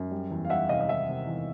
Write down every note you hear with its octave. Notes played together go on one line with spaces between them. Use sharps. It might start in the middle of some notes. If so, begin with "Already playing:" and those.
Already playing: F#2
G3
E2
F5
G3 E5 F#5
C3 D#5 F5
D#5
D#3 E5
C3
E2